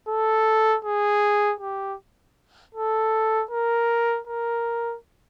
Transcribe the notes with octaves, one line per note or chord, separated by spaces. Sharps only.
A4
G#4
G4
A4
A#4
A#4